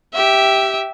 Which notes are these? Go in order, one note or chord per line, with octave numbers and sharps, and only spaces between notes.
G4 E5